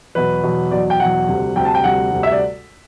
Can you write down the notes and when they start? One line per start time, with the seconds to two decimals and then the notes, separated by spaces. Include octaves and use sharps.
0.15 E2 B2 F#3 B4
0.43 E2 B2 F#3
0.71 E2 B2 F#3 D5
0.90 G5
1.00 E2 B2 F#3 F#5
1.28 D2 C3 G3
1.56 D2 C3 G3 G5
1.65 A5
1.75 G5
1.84 D2 C3 G3 F#5
2.12 D2 C3 G3
2.23 E5
2.32 D5